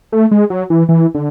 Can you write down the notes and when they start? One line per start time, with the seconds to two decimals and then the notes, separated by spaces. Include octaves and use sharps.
0.12 A3
0.31 G#3
0.50 F#3
0.70 E3
0.89 E3
1.15 D3